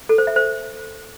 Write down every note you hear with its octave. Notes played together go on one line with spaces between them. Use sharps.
A4
C5
E5
C5